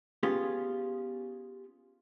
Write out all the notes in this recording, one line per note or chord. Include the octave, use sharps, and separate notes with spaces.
B3 C#4 F4 G4 G#4